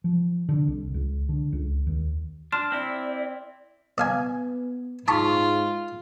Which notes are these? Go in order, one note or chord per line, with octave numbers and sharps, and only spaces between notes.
F3
D3
C2
C#2
D3
C#2
D#2
D4 C6 F6 E7
C4 E4 D5
B3 D5 F5 G#5
G#2 F4 A5 B5 C#6